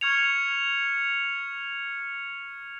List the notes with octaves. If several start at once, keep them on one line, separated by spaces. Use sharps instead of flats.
C#6 F6 G#6 C#7 F7